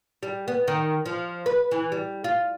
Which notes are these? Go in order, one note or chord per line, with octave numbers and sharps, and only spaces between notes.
G3
B3
D#3
F3
B4
E3
G3
F4